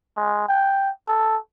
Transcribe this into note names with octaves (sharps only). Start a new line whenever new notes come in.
G#3
G5
A4